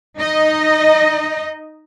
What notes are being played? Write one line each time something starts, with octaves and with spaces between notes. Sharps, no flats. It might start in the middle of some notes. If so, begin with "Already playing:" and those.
D#4 D#5